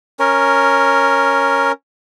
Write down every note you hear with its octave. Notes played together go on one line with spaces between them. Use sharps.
C#4 A#4